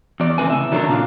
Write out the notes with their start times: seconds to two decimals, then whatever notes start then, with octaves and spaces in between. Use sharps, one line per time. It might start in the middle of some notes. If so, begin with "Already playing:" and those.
0.20 E2 D5
0.38 C#3 A3 C4 B4 G#5
0.50 A2 C#3 E5
0.72 D#3 F#3 G3 D4 A4 A#5
0.88 A#2 C#3 D4 C5 F5